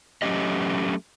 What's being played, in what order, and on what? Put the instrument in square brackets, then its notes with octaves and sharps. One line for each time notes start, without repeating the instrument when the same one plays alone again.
[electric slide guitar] F#3 A3 C#4 G4 D#5